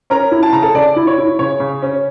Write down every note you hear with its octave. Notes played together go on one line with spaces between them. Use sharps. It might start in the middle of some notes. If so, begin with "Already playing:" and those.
C#4 A#4 A#5
E4
A5
C#3 A#5
A4 A5
C#3 D5
E4
C#5
E4
C#3 C#5
C#3
C#4